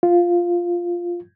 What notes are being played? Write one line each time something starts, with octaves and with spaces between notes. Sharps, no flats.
F4